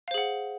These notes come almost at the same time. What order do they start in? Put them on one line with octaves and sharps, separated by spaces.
F5 C5 G#4 F#5